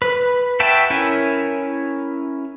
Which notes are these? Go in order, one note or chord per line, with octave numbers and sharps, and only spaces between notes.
B4
F#4 B4 E5 G5 A5
C#4 E4 A#4 G#5